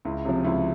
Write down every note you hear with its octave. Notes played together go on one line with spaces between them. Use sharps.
C#2 E4
C3 F3
C#2 E4